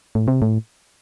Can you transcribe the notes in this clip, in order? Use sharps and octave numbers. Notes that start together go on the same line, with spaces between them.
A2
C3
A2